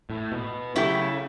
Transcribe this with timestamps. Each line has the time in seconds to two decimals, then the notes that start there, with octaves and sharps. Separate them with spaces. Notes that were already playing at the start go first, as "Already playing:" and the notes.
0.10 A2
0.32 B2
0.76 C#3 F#3 A3 E4 G4